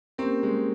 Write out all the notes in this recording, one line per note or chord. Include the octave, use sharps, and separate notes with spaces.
A#3 C4 C#4 G4 A#4
G#3